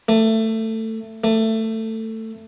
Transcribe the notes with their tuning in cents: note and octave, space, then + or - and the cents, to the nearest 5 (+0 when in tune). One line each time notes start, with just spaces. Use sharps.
A3 +15
A3 +15